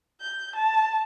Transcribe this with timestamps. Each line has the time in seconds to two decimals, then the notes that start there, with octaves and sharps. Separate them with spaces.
0.21 G6
0.56 A5